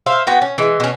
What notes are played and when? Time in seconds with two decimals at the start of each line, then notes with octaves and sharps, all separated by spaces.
0.06 C5 E5 F5
0.27 B3 F#4 G5
0.42 C#4
0.58 E3 G#3
0.80 B2 C#4